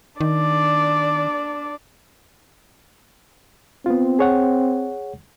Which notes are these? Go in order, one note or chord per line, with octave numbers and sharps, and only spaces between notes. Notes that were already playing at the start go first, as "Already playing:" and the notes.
D#3 D4 D5
B3 C4 F4
G#4 C#5 F#5